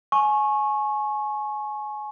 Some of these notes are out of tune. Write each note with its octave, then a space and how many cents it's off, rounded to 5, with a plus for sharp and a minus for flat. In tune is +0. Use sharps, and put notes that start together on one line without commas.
G#5 +25 C#6 -20